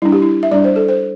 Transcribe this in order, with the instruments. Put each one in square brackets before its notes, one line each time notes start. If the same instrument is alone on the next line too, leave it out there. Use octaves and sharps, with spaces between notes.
[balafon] G3 D4 E4
G4
E4
E5
G3 D4 D5
C5
A4
C5